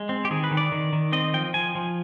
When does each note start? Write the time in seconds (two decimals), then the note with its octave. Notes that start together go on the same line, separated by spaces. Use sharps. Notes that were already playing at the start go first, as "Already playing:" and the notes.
Already playing: G#3
0.09 C4
0.25 G4
0.31 D#3 G#4
0.44 B4
0.51 D#3
0.57 D5
0.72 D#3
0.93 D#3
1.12 C4 D#5
1.34 F3 G5
1.54 F3 G#5
1.75 F3